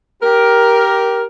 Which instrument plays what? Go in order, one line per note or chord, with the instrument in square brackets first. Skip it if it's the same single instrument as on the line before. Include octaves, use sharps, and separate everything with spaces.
[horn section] G4 A#4